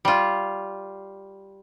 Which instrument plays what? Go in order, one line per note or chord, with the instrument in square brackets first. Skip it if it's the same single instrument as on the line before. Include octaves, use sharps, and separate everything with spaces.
[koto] G3 F4